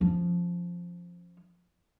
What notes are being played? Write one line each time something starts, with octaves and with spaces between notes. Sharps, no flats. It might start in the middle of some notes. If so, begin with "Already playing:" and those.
F3 C#4